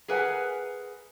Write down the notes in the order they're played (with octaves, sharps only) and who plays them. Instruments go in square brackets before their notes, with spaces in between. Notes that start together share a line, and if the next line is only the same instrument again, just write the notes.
[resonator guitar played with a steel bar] G#4 A#4 B4 E5 F#5 G#5